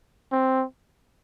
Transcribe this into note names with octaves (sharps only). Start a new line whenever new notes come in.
C4